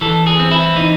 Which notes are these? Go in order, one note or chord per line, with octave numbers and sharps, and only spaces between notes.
E3 A4
G#4
C4
E4
E3 D#4